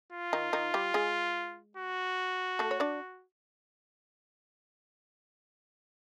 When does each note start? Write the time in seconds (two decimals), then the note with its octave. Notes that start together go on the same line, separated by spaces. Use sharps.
0.12 F4
0.33 D#3 D#4
0.53 D#3 D#4
0.74 G3 G4
0.94 G#3 G#4
1.77 F#4
2.59 A3 A4
2.71 C#5
2.80 D4 D5